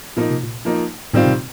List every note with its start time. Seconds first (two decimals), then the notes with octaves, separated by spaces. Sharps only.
0.16 A#2 F3 A#3 D#4
0.30 C3
0.43 A#2
0.65 F3 A#3 D#4
1.13 A2 D#3 G3 C4 F4
1.25 C3
1.30 A#2